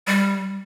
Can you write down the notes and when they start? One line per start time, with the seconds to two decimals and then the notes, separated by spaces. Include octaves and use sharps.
0.07 G3